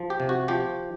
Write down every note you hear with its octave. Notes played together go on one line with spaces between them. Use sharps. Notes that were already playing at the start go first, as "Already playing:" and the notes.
Already playing: F3
G4
C3
F#4
F3 G4